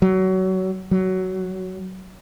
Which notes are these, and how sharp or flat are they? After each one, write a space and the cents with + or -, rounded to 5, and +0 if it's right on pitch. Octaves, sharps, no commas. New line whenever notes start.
F#3 +25
F#3 +15